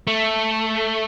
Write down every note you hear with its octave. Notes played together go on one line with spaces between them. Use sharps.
A3